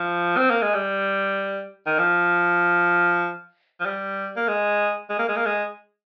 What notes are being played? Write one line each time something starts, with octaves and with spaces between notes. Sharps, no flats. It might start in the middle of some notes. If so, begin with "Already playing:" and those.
Already playing: F3
C4
A#3
G#3
G3
D#3
F3
F3
G3
A#3
G#3
G#3
A#3
G#3
A#3
G#3